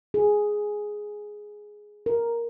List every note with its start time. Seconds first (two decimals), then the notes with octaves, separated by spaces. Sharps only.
0.14 G#4
2.06 A#4